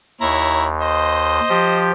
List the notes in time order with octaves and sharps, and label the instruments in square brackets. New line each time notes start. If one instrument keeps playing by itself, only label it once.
[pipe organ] D#2 [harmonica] E4 C#5 A#5
[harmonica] C5 D#5
[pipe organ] F3 G4